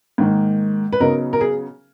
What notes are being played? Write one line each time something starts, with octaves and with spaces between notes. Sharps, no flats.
G#2 D#3 A#3
B4
C#3 F#3 B3 D#4 A#4
A#4
G#4